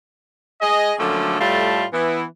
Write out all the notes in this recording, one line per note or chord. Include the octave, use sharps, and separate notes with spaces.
G#4 D#5
D3 F3 F#3 A3 A#3 C#4
A2 G3 A3 F4 A5
E3 B3 E4